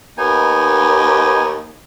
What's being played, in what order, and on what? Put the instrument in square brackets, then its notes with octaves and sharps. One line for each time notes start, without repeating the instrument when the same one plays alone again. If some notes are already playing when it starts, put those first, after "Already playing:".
[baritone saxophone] D#2 [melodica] B3 D#4 G#5